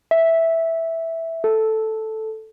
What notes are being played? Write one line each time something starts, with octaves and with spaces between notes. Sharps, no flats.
E5
A4